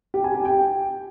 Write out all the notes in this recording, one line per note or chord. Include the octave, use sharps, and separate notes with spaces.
G4
G#5
G4
G5